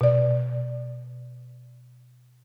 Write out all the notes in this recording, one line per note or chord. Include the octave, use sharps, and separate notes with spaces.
B2 D5